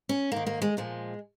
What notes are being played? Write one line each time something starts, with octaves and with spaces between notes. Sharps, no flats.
C#4
G#2 D#3 A#3
A#3
G#3
A#2 F3 G#3